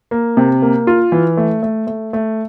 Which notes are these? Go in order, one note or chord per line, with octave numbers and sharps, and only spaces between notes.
A#3
C3
A#3
F4
E3
A3
A3
A3
A3